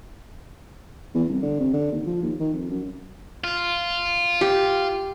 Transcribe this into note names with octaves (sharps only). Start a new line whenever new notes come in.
E2
C2
D3
C3
D3
D#2
F3
D#2
D#3
F2
F#2
F4
G4